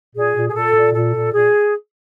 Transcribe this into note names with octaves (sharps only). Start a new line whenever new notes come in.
A#2 G#4
A#2
G#4
A#2 A4
A#2
A#2 A4
A#2
A#2 G#4